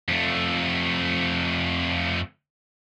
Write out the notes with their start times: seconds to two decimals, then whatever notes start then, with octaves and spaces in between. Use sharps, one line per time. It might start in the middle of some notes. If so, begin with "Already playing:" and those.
0.09 F2 A3